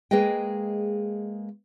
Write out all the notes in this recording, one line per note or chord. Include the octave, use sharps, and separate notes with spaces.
G#3 A#3 G#4 B4 D#5 G5